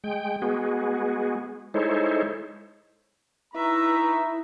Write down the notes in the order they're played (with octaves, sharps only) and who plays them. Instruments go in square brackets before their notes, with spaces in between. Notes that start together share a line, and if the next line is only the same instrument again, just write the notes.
[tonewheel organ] G#3 G5
G#3 B3 F#4 G#4
G#3 D#4 E4 A4 C5 C#5
[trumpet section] D#4 A#5 C#6 [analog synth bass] E4 [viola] B4 E5